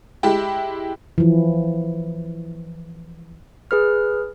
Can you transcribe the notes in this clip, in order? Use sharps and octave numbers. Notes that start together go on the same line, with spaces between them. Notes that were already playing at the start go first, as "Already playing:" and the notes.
G#3 E4 G4
E3 F3
G#4 B4 F6